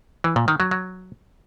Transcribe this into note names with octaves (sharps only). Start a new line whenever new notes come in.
E3
A#2
D#3
F#3
F#3